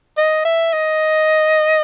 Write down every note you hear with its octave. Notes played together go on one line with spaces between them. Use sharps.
D#5
E5
D#5